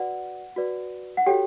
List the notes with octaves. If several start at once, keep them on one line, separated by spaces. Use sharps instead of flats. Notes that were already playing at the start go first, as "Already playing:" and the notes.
Already playing: F#4 B4 D5 F#5
F#4 B4 D5
F#5
F#4 G4 A4 C#5 G5